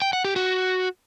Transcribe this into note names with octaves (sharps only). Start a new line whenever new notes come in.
G5
F#5
G4
F#4